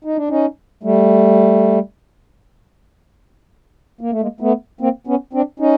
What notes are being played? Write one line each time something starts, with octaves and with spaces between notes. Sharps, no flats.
D#4
D4
C#4 D#4
G3 A3
A#3
A3
G#3 A#3
A3 B3
A#3 C4
B3 C#4
C4 D4
C#4 D#4